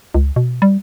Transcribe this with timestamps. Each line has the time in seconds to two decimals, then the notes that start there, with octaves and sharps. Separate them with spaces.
0.14 C#2
0.36 B2
0.62 G3